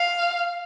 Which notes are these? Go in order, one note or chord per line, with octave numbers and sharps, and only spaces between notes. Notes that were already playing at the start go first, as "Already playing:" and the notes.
Already playing: F5